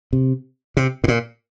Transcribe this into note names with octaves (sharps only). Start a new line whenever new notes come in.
C3
C3
A2
A#2